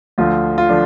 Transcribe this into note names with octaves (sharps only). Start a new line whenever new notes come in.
D2 D3 F3 F4
F4
D3 F3 D4